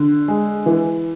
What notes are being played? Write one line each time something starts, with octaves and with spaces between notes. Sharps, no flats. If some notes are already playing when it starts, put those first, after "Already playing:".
Already playing: D3
G#3
E3